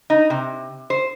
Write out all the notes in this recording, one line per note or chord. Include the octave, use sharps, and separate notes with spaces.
D#4
C3
C5